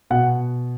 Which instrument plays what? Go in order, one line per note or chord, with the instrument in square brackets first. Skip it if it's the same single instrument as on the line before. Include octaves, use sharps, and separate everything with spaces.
[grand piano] B2 F#5